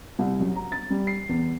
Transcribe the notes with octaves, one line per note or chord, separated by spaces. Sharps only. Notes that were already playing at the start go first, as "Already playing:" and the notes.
C2
F#2
A#5
A6
G3
C7
E2